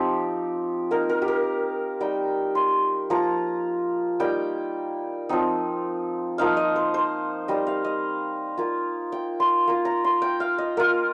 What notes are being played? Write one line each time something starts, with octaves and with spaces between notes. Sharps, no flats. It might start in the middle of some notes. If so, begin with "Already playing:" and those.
Already playing: F3 C4 D#4 G4
A#3 D#4 A#4
A#4
G4
A#4
G3 D#4 G5
C6
F3 A#3 F4 A#5
G3 A#3 D#4 G5
F3 C4 D#4
F3 A#3 D#4 F5
D#5
C5
C5
G3 D#4 D#5
F5
D#5
A#3 F4
G5
C6
A#3 F4
A#5
C6
G5
F5
D#5
A#3 F4 A#4